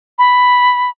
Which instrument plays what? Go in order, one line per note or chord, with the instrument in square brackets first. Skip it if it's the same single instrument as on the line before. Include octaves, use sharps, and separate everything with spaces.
[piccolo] B5